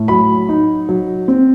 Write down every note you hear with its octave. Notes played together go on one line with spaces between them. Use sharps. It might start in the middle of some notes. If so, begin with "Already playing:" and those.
Already playing: A2
F#3 B5
D#4
F#3
C4